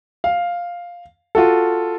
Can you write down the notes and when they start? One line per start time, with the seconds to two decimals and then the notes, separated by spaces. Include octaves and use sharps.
0.24 F5
1.35 F4 F#4 A4